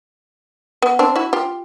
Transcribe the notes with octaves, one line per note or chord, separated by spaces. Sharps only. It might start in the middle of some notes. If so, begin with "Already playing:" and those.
B3
C4 D4
E4 F#4
F4 G4